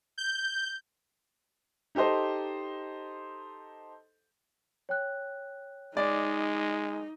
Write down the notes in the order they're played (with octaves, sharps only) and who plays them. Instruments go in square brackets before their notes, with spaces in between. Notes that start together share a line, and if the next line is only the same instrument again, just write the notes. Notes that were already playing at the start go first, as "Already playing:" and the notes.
[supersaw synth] G6
[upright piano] D#4 G4 A4 C5 D#5
[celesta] C#5 G5 F#6
[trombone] G#3 [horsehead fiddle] D#4 [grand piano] D5